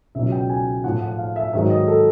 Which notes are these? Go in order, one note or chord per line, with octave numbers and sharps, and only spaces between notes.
C#2 B2 F#3 E5
G5
G#5
A2 F3 F#5
F#5
F5
E5
G#2 D#3 F#3 E5
D#5
A4